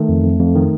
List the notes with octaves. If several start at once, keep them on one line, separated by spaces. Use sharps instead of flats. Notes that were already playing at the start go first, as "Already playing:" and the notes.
Already playing: D#3 A3
F2
F2
F2
D#3